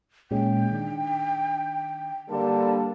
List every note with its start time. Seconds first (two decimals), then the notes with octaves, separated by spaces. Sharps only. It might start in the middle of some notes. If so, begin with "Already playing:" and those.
0.31 A#2 G#3 C#4 G5
0.71 D#3 D4
2.30 D3 G3 A#3 A5